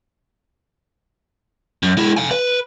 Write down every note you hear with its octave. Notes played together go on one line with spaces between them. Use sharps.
F#2
G#3 E4
F5 G#5
B4